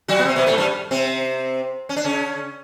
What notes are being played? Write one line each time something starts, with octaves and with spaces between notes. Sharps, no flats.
F#3 F#4
B3
C3 C4
B2 B3
A2 A3
G2 G3
C3 C4
C#4
D4
C#3 C#4